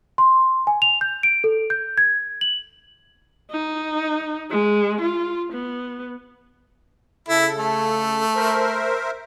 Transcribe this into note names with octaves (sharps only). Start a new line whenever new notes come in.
C6
G#5
F7
G6
D7
A4
G6
G#6
F#7
D#4
G#3
F4
B3
C#3 E4 A4
A3
A#4 C5 E5